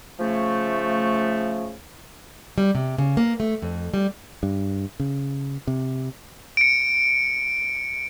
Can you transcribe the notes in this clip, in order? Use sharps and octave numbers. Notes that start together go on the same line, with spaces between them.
C#3 F3 A3
G3
C3
C#3
A#3
A3
F2
G3
G2
C#3
C3
C#7 D7